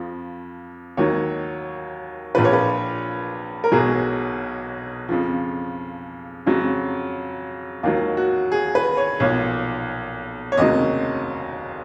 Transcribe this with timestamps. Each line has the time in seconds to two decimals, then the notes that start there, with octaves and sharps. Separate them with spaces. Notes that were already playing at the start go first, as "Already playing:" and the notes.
Already playing: F2 F3
0.97 D#2 D#3 F#3 C#5
2.35 A#1 A#2 F3 B4
2.45 C#5
2.53 B4
3.64 A#4
3.72 B1 B2 F#3 G#4
5.09 F2 C#3 F3
6.46 F2 C#3 F#3
7.83 D#2 D#3 F#3 F4
8.17 F#4
8.52 G#4
8.75 B4
8.97 C#5
9.20 B1 A#2 F3 C#5
10.52 C#5
10.57 F1 D#2 C#3 F#3 D#5